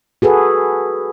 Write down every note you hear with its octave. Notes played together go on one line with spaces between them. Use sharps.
F#4 G#4 A4 B4